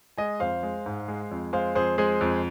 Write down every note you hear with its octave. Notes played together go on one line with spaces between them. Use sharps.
G#3 D#5 G#5
F2 C5 F5
G#3
G#2
G#3
F2
G#3 C5 F5
F2 G#4 C5
G#3 G#4 C5
F2